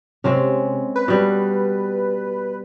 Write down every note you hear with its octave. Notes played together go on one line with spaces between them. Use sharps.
C3 G#3 C4 C#4
B4
B2 G3